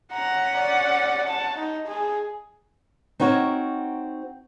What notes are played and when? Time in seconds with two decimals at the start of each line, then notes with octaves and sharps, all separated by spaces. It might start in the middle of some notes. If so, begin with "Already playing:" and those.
0.13 C#4 F#5 A#5
0.58 D5
1.29 A5
1.59 D#4
1.87 G#4
3.20 C4 D#4 F#4 A#4 C#5